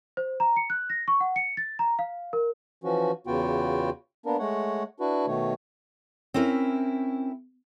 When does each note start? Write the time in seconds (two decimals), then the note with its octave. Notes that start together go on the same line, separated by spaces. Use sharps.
0.17 C5
0.40 A#5
0.56 C#7
0.70 F#6
0.90 A#6
1.08 C#6
1.20 F#5
1.36 C#7
1.57 A6
1.79 A#5
1.99 F5
2.33 A#4
2.84 E3 F3 C#4 F#4
3.27 E2 C#3 B3 F4 F#4 G5
4.26 A#3 B3 D4 A#4
4.39 G#3 A3 C#5 F#5
5.00 D4 E4 F#4 B4
5.27 B2 D#3 A3 C#5
6.34 C4 C#4 E4 A#4